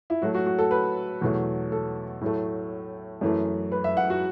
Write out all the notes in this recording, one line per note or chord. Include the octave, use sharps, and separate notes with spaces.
E4
A2 F#3 A3 F#4
F#4
F#4
A4
B4
E2 B2 F#3 A3
A4
A2 F#3 A3
F#2 E3 A3
B4
E5
F#5
F#4